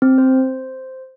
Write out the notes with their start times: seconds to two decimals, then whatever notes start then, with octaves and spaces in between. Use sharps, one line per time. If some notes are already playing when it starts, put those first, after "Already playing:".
0.02 C4
0.18 C5